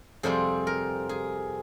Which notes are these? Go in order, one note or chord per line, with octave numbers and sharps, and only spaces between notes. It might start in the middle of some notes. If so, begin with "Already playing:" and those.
F2 C3 G3 C4 G#4
A#4
G#4